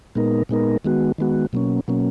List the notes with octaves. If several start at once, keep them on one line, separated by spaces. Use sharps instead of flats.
A#2 G#3 B3 D#4 A#4
A#2 G#3 B3 D#4 A#4
D#3 G#3 B3 F#4
D#3 G#3 B3 F#4
B2 F#3 A#3 C#4
B2 F#3 A#3 C#4